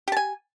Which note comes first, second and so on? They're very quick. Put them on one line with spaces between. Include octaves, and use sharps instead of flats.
G4 A5 G#5